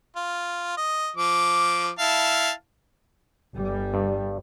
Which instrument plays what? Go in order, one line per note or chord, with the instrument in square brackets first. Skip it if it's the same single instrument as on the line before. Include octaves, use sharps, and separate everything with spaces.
[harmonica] F4
D#5
F3 D6
E4 F5 A5
[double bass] G1 G3
[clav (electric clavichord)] G2